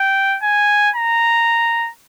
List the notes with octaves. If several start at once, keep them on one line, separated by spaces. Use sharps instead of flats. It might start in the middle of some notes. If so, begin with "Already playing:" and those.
Already playing: G5
G#5
A#5